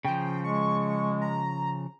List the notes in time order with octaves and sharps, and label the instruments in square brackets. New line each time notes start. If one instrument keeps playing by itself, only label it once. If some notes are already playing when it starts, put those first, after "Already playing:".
[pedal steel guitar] C#3 F3 [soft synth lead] G5
[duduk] G#3 [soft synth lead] C#6
[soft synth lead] A#5